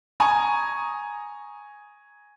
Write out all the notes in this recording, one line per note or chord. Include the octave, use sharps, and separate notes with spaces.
G#5 A#5 C#6 D#6